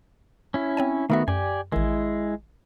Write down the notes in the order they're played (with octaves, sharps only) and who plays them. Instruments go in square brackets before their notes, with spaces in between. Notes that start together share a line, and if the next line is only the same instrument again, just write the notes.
[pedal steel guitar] C#4 E4
[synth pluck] C4 C#5 G#5
[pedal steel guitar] D#3 B3 F#4 [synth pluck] A3 A4 E5
[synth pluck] F#2 [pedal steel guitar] G4 D5 G#5
[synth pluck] A1 D#3 [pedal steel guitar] G#3 E4